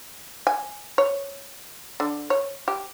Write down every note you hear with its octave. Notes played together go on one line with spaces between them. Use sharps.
G#5
C#5
D3
C#5
G4